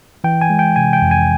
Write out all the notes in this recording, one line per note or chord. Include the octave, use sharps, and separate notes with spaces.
E3 G5
G#5
G#3
G5
C3 G#5
G5
F2
G#5